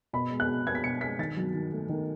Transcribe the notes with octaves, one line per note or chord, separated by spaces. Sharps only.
B2 B5
G#3
F#6
B2
B3 G#6
B6
B2 C#7
G#3 B6
D#3 A6
F#3
D#3
A3
D#3